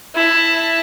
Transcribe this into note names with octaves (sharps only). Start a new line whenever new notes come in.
E4 A5